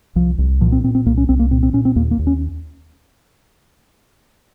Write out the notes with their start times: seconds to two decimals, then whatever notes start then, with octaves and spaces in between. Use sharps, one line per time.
0.15 C2 F3
0.38 C2
0.61 A#2 F3
0.72 C4
0.84 A#2 C4
0.95 C4
1.06 C2 A#3
1.17 C#4
1.29 C2 C4
1.39 A#3
1.51 A#2 C4
1.63 C4
1.73 A#2 C#4
1.85 C4
1.96 D#2 A#3
2.11 A#3
2.19 D#2
2.27 C#4